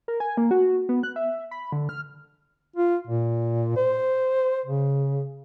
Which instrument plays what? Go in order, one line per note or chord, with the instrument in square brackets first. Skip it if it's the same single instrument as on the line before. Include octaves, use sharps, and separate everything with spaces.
[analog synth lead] A#4
G#5
A#3
F#4
B3
F#6
E5
B5
D3
F6
[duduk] F4
A#2
C5
C#3